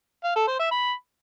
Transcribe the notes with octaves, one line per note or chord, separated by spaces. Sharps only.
F5
A4
C5
E5
B5